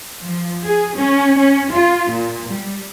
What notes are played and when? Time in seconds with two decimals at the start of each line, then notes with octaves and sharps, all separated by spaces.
0.23 F3
0.65 G#4
0.98 C#4
1.38 C#4
1.72 F4
2.10 A#2
2.51 G3